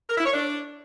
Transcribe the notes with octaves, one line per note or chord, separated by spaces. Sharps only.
A#4
E4
C#5
D4